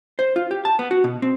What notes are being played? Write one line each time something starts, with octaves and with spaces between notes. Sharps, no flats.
C5
F4
G4
A5
B3
F#4
B2
C4